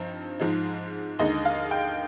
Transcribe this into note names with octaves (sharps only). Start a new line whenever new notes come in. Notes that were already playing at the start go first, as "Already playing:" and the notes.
Already playing: G2 F3 C4 D#4
G#2 F3 G#3 D#4
D#2 D3 G#3 D#4 D#5
F5
G5